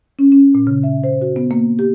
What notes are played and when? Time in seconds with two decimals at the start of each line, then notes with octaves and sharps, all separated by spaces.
0.19 C#4
0.32 C#4
0.55 A#2
0.67 C#3
0.83 E5
1.04 C5
1.22 F#4
1.36 B3
1.51 A#3
1.79 G4